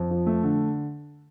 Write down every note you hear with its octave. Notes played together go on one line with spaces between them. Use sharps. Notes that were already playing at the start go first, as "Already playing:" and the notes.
Already playing: F2
F3
A3
D3